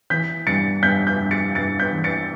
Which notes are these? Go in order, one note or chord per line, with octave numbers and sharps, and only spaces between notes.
E3 G6 B6
G2 A6 C#7
G2 G6 B6
G6 B6
G2
A6 C#7
G2 A6 C#7
G6 B6
E3
A6 C#7